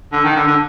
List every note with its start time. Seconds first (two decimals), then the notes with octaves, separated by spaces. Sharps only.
0.12 D3
0.24 D#3
0.36 D3
0.47 D3